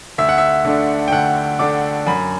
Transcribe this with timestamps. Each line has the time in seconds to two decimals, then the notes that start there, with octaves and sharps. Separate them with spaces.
0.18 D2 E5
0.29 F#5
0.38 E5
0.65 D3 A3 D4
1.08 G5
1.12 D2 F#5
1.59 D3 A3 D4 D6
2.07 F#2 B5